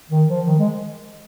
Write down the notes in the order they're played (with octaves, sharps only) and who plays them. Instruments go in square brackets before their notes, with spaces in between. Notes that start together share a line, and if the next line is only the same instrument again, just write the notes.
[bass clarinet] D#3
F3
D#3
G#3